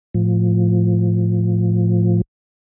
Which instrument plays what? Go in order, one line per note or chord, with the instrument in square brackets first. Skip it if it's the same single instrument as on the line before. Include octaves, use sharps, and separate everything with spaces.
[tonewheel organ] A2 F3